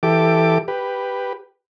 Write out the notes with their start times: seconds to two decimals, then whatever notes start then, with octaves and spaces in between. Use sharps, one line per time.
0.03 E3 G4 A4 D6
0.68 G4 B4